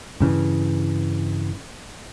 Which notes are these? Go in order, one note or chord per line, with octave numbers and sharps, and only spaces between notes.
G2 C#3 E3